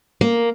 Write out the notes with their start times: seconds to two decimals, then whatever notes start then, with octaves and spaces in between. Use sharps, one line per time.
0.21 A#3